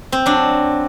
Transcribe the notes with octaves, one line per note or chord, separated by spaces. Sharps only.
C4
F#3 D4